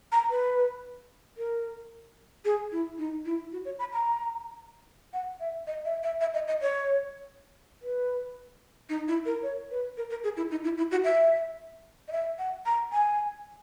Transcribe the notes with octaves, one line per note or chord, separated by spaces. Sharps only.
A#5
B4
A#4
G#4
E4
D#4
E4
F#4
C#5
B5
A#5
F#5
E5
D#5
E5
E5
E5
D#5
D#5
C#5
B4
D#4
E4
A#4
C#5
B4
A#4
A#4
G#4
E4
D#4
E4
E4
F#4
E5
D#5
E5
F#5
A#5
G#5